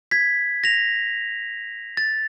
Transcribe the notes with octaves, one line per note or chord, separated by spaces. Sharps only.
G#6 B6
A#6 F7
A6